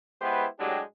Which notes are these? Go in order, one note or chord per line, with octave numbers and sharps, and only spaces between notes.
G#3 B3 E4 G4 B4 C5
A2 F#3 G#3 D4 G4